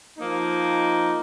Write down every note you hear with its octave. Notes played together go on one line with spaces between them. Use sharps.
F3 A#3 D#4